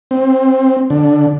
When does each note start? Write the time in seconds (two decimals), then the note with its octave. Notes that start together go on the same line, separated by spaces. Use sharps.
0.11 C4
0.90 D3